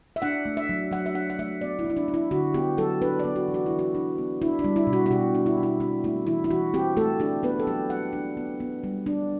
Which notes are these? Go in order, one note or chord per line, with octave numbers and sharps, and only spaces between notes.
E5
D4 F#5
A3
E5
F#3
F#3 F#5
E5
D4 F#5
F#5
A3 E5
B3 D5
E4
F#3
E4
D4
D4
E4
D3 F#4
B3 G4
F#3 A4
D4 B4
D5
B3
F#4
E3
F#4
E3 E4
F#4
D4
B3
D4 E4
D4
G3
E4
B2
F#4
F#4
B2 G4
D4
E4
G3
E4
C4 F#4
A3 E4
E3 E4
E4
E3 F#4
C4 G4
A3 A4
D4 G4
B3 B4
A4
F#3 G4
F#3 F#5
D4
B3
B3
G3
D4